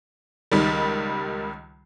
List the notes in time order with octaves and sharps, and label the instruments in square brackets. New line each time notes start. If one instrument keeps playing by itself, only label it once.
[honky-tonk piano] C#2 D#3 G3